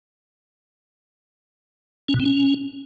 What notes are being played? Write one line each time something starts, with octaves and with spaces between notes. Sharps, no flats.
C#4
B2
C4
C#4